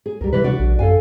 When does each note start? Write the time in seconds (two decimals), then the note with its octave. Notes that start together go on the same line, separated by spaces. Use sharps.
0.06 G#4
0.21 D2 G3 A#4
0.33 C3 E3 G3 B4
0.44 D4 F#4 D5
0.59 A#1
0.79 F#2 A4 F5 G#5